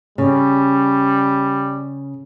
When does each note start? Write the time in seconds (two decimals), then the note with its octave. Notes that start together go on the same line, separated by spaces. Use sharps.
0.18 C#3 G3